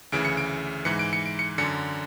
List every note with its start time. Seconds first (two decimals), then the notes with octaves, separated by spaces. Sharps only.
0.12 D2 C#3 E3 D7
0.25 C#7
0.37 D7
0.85 G#2 E3 C#7
0.99 D7
1.13 C#7
1.26 D7
1.39 C#7
1.58 F#2 D3 C#7